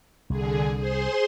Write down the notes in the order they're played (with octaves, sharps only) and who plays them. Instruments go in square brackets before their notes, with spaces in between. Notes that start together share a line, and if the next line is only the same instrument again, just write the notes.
[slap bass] C2 [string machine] D3 G#4
[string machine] G#4 C5 C6